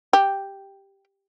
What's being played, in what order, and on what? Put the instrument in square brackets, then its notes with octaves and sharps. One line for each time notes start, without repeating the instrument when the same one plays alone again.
[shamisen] G4